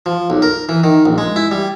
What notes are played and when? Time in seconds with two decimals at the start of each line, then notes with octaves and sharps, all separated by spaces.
0.06 F3
0.30 B1
0.42 A#4
0.69 E3
0.84 D#3
1.05 A#1
1.18 G#3
1.36 E4
1.51 G3